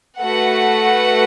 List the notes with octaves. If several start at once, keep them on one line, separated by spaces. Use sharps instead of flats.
A3 F#4 B4 F#5